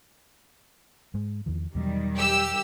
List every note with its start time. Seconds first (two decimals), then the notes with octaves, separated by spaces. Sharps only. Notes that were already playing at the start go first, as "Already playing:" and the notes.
1.14 G#2 G#3
1.46 E2 D#3 F3
1.75 E2 B2 D#3 F#3 G3
2.17 G4 E6